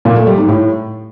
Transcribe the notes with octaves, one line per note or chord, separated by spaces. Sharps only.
A#2
A3
G3
G#2
A2